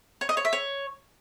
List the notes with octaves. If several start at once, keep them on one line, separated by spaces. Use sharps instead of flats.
C#5
D#5
C#5
E5
C#5